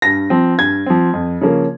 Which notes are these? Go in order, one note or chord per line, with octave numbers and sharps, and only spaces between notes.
G2 A#6
F3 C4
G2 G#6
F3 C4
F2
C#3 F3 A#3 C#4